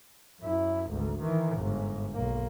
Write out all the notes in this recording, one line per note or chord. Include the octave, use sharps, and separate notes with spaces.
F#2 E4
G#1 D2
D#3 E3
G1 G#2
B1 A#3